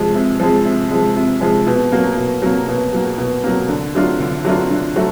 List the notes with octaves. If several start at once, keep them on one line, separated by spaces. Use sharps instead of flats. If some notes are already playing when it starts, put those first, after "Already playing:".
Already playing: C3 F3 G#3
C3
F3 G#3
C3
F3 G#3
C3
F3 G#3
B2
F#3 A#3
B2
F#3 A#3
B2
F#3 A#3
B2
F#3 A#3
D3
F#3 A3 D4 F4
D3
F#3 A3 D4 F4
D3
F#3 A3